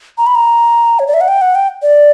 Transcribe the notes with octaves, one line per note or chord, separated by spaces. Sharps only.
A#5
B5
A#5
C#5
D5
E5
F#5
G5
F#5
G5
D5